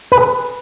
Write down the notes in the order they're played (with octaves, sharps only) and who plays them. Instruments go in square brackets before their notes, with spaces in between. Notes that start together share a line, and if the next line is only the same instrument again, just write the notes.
[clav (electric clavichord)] B4